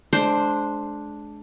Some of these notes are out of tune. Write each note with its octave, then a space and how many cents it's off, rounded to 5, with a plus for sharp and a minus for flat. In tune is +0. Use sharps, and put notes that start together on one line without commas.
G#3 +35 D4 +0 C5 +0